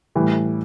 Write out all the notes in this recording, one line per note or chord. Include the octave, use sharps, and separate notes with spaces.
A2 E3 G3